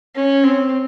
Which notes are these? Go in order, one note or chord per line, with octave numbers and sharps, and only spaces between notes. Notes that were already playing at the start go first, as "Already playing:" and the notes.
C#4
C4